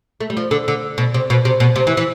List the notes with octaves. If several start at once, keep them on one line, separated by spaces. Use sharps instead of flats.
A3
G3
F3
D3
D3
B2
C3
B2
C3
B2
C3
E3
E3